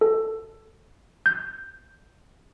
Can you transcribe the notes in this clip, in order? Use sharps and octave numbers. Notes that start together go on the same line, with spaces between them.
A4
G6